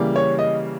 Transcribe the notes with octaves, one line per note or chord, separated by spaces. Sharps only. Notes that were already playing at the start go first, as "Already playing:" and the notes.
Already playing: C#3 E3 G3 A#3
C#5
D#5